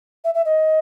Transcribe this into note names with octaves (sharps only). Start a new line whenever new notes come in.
E5
E5
D#5